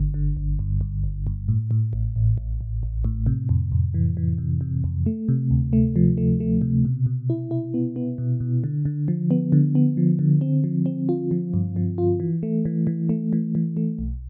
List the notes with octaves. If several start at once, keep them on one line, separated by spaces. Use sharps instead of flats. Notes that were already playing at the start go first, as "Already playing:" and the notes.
Already playing: G1 D3
D3
G1
G2
G2
G1
G2
A2
A2
A1
A1
A1
A1
A1
A2
C3
F2
F2
E3
E3
C3
C3
F2
A3
C3
D2
A3
F3
A3
A3
C3
B2
B2
E4
E4
B3
B3
B2
B2
D3
D3
F3
B3
D3
B3
F3
D3
C4
F3
C4
F4
F3
G2
F3
F4
E3
A3
E3
E3
A3
E3
E3
A3
B1